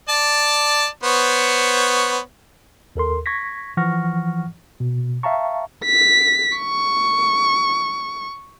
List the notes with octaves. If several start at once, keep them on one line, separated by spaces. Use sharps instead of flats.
D5 A5
B3 C5 C#5
D#2 A4 A#4 C6
C#6 G#6 A#6 B6
E3 F3 F#5 C#6 F6 A#6
B2
E5 F5 G5 A5 A#5 C#6
B6
C#6